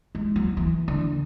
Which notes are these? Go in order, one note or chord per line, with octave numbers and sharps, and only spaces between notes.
G#3
F#3
E3
D3